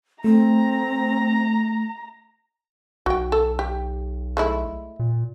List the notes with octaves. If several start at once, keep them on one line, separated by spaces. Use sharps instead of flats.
A3 C4 A#5
B1 F#4 G5
A4
G4
G#3 A3 E4
A#2